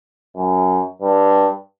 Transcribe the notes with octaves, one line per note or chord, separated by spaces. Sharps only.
F#2
G2